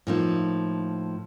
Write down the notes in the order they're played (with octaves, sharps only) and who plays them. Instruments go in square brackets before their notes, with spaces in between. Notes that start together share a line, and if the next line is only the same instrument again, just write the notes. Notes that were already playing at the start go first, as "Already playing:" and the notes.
[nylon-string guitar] A2 F3 A#3 D#4